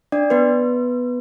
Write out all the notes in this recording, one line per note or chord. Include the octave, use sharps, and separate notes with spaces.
D4 D5
B3 B4